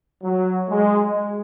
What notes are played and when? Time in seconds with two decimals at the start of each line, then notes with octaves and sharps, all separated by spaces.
0.23 F#3
0.69 G#3